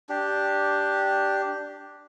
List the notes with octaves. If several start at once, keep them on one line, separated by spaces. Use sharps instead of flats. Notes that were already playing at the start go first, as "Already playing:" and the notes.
D4 G4